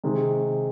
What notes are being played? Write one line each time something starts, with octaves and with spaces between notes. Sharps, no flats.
C3 D#3 G#3